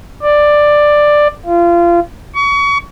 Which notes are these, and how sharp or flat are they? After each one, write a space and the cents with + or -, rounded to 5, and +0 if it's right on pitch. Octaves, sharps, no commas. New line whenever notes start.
D5 +10
F4 -25
C#6 +30